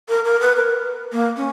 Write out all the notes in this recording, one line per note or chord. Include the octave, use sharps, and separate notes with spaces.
A#4
A#4
B4
A#4
A#3
C#4